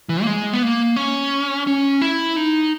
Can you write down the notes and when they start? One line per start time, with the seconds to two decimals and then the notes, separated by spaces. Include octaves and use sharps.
0.09 E3
0.22 A#3
0.27 G#3
0.53 B3
0.62 A#3
0.96 C#4
1.67 C#4
2.01 E4
2.36 D#4